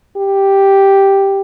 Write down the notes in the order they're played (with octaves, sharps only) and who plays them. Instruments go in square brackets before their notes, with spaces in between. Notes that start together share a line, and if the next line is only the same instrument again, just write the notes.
[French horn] G4